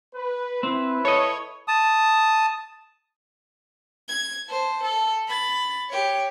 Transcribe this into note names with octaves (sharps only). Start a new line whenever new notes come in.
B4
C4 E4 B4
A4 C#5 D#5
A5 D#6
G#6
C5 A5
A4
B5 A6
G4 C#5